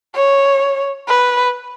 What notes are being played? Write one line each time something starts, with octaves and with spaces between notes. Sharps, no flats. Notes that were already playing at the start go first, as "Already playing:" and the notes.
C#5
B4